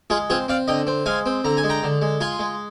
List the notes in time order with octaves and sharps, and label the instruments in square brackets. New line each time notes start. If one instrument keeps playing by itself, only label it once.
[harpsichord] G#3 F4 G#4
C4 F4 G#4
C4 D5 F5
D3 D#5 G5
C4
G#3 F5 G#5
C4
D3 A#5
G#5
G#3
G5 A#5
D3
G#3
F4 G#5 C6
G#3